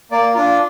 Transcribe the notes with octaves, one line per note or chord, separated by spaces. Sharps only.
A#3 D5
D4 F4